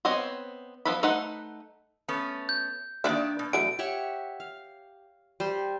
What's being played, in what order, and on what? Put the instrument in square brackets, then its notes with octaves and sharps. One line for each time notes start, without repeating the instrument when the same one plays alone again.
[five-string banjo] B3 C4 C5 C#5 D#5
F3 B3 A4 B4 B5
A3 D#4 B4 C5 F#5
[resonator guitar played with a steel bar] A3 B3 C#4
[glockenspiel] G6
[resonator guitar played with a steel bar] D#3 D4 [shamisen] A#3 D5 E5
[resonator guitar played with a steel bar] B2
[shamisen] E3 F#3 A3 [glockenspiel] D7
[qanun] G4 C#5 E5 F#5
F5
G3 C5